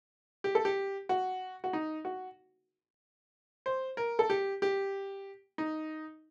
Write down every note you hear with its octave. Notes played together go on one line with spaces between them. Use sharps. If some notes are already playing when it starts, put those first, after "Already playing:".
G4
A4
G4
F#4
F#4
D#4
F#4
C5
A#4
A4
G4
G4
D#4